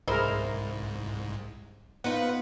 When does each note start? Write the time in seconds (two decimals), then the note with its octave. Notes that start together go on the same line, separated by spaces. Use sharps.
0.08 C2 G#2 E4 G#4 A#4 C5 D#5
2.04 B3 D#4 F4 B4 F#5